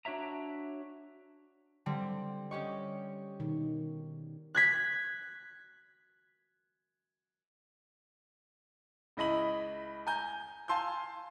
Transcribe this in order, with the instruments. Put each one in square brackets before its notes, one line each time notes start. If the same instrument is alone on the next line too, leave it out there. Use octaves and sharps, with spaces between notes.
[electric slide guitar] D4 F#4 C#5 E5 A#5
[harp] D3 G3 C4
[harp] C#4 G4 C#6 [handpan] D#5
[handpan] B2 D#3
[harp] F#6 G#6 B6
[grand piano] C#2 E4 D#5 B5 F#7
G#5 A#5 G6
F5 G#5 A5 C6 E6 G6